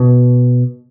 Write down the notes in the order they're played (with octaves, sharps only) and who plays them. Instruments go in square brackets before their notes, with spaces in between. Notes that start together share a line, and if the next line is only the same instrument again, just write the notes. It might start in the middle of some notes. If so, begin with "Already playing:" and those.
Already playing: [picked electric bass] B2